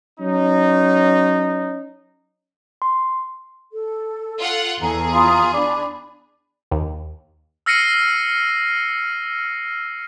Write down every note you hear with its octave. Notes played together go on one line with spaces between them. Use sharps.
F#3 C#4 D#4
C6
A4
F4 F#5
E2 G#4 A4 A#5
F4 A#5 B5 D#6
D4 D5 B5
D#2
E6 F6 A#6 C7 C#7 D#7